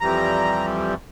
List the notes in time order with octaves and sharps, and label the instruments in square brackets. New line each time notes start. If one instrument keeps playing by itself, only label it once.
[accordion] F2 E3 G3 A#5